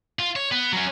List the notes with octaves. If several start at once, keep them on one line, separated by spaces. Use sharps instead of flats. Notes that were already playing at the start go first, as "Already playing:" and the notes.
F4
C#5
B3
F#3 C#4